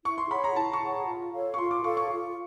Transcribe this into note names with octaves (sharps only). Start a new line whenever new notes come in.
E4 C#6
C6
G#4 C#5 F#5 B5
A#5
E4 A5
C#6
G#4 C#5 F#5
F4
A4 C#5 F5
C#6
F4 C6
D6
A4 C#5 F5 C#6
C#6
F4